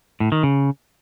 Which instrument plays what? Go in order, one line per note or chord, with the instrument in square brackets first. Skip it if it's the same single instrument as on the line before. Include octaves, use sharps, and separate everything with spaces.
[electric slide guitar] A2
D#3
C#3